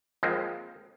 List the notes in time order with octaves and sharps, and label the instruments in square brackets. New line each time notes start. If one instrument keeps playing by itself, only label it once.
[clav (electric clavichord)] F3 G#3 A#3 C4